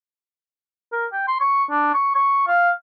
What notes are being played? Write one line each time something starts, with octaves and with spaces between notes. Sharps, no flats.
A#4
G5
C6
C#6
D4
C#6
C#6
F5